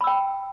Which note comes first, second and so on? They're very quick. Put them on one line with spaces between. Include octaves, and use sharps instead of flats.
B5 E6 G5